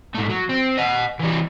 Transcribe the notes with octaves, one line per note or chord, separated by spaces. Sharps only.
G#2 A3
F#3
C4
D#5 F#5
E3 G3